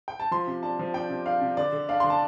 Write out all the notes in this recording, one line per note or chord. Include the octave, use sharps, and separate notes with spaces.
G5
A5
F3 C6
C3
D4 A5
F3
D4 G5
C3
D4 F5
C3
D3 D5
D3
D4 F5
D3 C6
A5